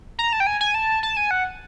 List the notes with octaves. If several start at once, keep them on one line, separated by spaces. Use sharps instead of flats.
A#5
A5
G5
G#5
G#5
A5
A5
G#5
F#5